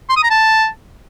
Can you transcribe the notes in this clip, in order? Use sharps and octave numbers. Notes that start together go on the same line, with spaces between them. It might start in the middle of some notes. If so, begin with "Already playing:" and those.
C6
D#6
A#5
A5